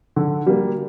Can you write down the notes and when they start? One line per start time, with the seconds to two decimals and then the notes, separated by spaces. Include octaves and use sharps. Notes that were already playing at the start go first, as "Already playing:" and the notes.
0.16 D3
0.47 G3 A#3